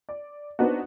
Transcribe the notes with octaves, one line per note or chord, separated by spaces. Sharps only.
D5
B3 C4 D4 D#4 F#4